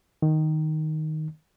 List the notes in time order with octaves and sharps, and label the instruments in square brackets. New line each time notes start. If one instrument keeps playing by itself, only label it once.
[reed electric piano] D#3